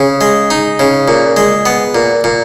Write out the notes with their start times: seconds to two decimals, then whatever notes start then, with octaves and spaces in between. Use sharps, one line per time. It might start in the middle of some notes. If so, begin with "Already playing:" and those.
Already playing: C#3
0.21 G#3
0.50 D#4
0.79 C#3
1.08 A#2
1.37 G#3
1.66 B3
1.95 A#2
2.24 A#2